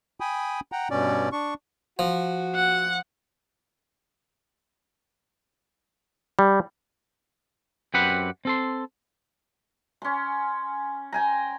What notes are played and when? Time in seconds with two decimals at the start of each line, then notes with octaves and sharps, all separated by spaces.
0.20 G5 G#5 B5 D#6
0.72 F#5 G5 A#5
0.91 G2 B2 C#4 D5
1.32 D4 C#6
1.99 F3 F#4
2.56 F#5
6.39 G3
7.94 F#2 C4 G4 B4 F#5 B5
8.45 C4 A4 C6
10.02 C#4 C6
11.12 G5 G#5 A#5